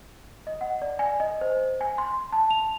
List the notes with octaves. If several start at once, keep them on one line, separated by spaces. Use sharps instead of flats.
D#5
F#5
D5
G#5
D#5
C5
G#5
C6
A5
F7